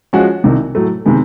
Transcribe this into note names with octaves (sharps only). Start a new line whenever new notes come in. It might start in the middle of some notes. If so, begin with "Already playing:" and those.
F3 G#3 C#4 F#4
C2 C3 D#3
A2 F#3 A3
C3 D#3 G#3 B3